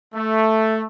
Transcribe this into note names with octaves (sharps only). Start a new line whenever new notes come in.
A3